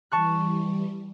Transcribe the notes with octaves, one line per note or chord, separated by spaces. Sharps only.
E3 G3 A5 C#6 F#6